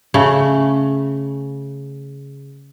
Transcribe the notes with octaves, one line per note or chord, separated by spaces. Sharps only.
C#3 A3